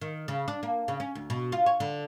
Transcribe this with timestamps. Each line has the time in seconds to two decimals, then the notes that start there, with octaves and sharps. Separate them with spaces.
0.02 D#3
0.28 C#3
0.48 D4
0.63 A#3
0.88 C#3
1.00 C#4
1.15 D2
1.30 B2
1.52 F4
1.66 C#5
1.80 D3